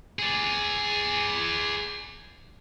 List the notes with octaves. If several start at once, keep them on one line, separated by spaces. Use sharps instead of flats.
G#4 D5